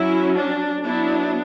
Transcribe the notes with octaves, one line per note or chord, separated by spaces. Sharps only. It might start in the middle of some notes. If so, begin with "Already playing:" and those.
Already playing: F#3 C#4 E4
D4
F#3 B3 D4 E4